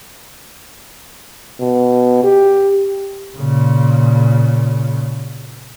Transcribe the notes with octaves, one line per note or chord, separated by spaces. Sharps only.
B2
G4
A#2 C#3